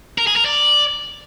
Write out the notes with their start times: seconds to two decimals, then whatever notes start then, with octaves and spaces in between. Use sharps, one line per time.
0.18 A#4
0.27 G#4
0.36 A#4
0.45 D5